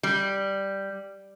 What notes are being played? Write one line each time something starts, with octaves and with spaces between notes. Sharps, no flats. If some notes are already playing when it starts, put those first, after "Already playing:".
G3